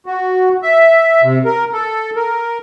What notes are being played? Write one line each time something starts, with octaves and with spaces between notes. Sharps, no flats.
F#4
E5
C3
A#4
A4
A#4